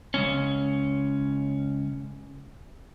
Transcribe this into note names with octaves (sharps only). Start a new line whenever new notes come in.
C#2 F#2 C#4